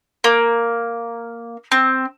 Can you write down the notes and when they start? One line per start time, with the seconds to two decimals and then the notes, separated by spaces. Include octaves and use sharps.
0.24 A#3
1.72 C4